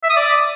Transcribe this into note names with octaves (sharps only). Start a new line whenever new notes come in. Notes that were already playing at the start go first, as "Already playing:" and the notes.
E5
D#6
D5